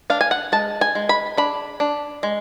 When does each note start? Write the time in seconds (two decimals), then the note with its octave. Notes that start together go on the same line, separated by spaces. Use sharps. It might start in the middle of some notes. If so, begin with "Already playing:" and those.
0.10 D4 F5
0.21 G#5
0.31 F#5
0.52 G#3 A5
0.81 G#5
0.95 G#3
1.09 B5
1.37 D4 B5
1.80 D4
2.23 G#3